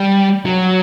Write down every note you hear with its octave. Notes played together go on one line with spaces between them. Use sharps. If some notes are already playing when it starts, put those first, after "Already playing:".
Already playing: G3
F#3